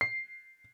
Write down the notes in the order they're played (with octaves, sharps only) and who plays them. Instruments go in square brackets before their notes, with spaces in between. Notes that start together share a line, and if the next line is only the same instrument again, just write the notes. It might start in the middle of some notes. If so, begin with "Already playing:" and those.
[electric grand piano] C7